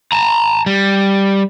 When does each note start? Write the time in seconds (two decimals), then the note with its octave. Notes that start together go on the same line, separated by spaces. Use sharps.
0.12 A5 A#5
0.66 G3